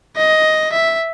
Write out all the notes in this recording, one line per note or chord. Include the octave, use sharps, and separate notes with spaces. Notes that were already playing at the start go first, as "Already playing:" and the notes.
D#5
E5